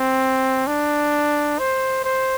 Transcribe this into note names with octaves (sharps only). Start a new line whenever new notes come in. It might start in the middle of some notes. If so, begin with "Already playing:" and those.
Already playing: C4
D4
C5
C5